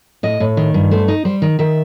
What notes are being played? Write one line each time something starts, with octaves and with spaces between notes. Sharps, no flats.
A2 D#5
A2
D#3
G2
A3 C5
D#4
G3 C5
D#3
D#3 E5